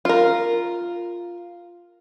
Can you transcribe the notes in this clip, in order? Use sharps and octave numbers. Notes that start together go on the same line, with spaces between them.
F4 A#4